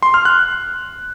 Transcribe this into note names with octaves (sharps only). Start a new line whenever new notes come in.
C6
F6
F#6